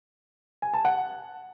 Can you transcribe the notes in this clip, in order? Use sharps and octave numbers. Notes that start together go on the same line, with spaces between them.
G#5
A5
F#5